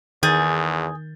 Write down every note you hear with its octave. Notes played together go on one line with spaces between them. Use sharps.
E2 D#3 G#4 G#5 G6 A6